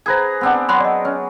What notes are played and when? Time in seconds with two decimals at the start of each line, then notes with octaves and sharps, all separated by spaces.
0.06 G#4 B4 C5 A#5 G#6
0.41 B3 C4 D4
0.69 F#3 B5 C6 F#6
0.80 D5 D#5
1.05 C#4